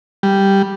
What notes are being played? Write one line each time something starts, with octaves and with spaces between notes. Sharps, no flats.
G3